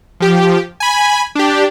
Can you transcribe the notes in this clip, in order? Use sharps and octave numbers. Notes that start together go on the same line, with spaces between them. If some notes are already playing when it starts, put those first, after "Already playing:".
F3 G4
G#5 B5
D4 G4